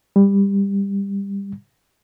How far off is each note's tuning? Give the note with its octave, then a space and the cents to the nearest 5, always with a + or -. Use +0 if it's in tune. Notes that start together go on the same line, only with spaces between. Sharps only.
G3 +20